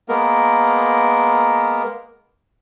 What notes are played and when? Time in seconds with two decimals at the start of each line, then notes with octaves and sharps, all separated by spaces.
0.09 G#3 A#3 B3 A#4